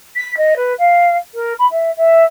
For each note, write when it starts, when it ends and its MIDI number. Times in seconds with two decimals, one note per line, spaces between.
0.16 0.35 95
0.37 0.54 75
0.56 0.73 71
0.78 1.16 77
1.34 1.53 70
1.59 1.66 83
1.71 1.90 76
1.97 2.23 76